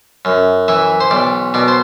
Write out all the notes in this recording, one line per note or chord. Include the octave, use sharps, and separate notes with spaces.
F#2
E3 E5
C5
B1 D5
B2 D5
C5